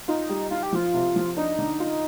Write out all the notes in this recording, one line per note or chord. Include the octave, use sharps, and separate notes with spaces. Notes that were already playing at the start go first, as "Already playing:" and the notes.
D#4 F4
G3
D#4 F4
G4
F3 F4
C3
F3
D4 D#4
D3
F4